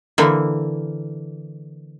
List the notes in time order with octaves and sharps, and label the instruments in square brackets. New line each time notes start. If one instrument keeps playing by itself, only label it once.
[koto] D3 E3 A#3